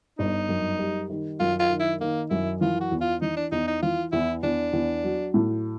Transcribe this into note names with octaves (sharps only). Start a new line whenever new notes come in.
G1 D#4
F#2
G3
D#3
F#2 F4
F4
D#3
E4
D#3 A#3
F#2 E4
E3 F4
F#4
E2
F4
E3 D#4
D4
E2 D#4
D#4
E3 F4
E2 E4
E2 D4
E2
F#3
A2